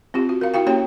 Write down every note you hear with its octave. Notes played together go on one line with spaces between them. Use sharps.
C4 F4 G4
F#4
A#4 F5
E4 F#4 F5 G5
A#3 C#4 G4 C#5 G5